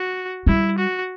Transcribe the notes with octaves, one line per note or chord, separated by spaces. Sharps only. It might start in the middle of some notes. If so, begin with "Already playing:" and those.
Already playing: F#4
G3 E4
F#4